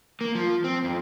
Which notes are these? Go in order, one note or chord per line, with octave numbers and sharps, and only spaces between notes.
A#3
F3
C4
F2